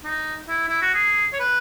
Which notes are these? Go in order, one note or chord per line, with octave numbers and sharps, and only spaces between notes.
D#4
E4
E4
F#4
G#4
C#5
B4